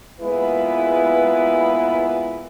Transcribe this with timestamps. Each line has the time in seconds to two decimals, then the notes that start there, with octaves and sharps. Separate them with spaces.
0.20 A#2 G#3 B3 E4 B4